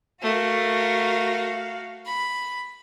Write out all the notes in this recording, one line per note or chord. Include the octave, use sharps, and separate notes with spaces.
A3 F#4 A#4 F5
B5